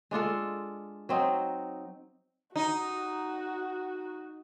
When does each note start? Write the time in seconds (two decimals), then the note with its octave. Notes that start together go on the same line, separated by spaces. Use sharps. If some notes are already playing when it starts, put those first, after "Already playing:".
0.11 G#3 D4 F4 A4
1.09 F#3 C4 D#4
2.56 D#4 F#4